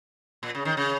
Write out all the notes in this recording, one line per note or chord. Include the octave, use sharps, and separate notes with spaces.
A#2
C#3
D#3
C#3